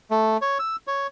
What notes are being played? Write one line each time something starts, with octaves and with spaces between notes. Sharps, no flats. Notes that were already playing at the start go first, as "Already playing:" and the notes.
A3
C#5
E6
C#5